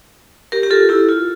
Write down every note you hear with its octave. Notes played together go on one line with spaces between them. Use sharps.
G4 A#4
G4
F4 A4
E4 G4
F4